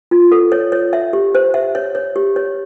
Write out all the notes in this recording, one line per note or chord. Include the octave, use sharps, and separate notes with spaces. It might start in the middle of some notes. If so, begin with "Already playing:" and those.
F4
A4
C#5
C#5
E5
G4
C5
E5
C#5
C#5
G4
C#5